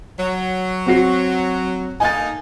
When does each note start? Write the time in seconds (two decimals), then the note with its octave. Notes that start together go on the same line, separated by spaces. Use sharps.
0.19 F#3
0.86 C4 F#4 C7
2.00 D3 A#3 D#4 G#5 A6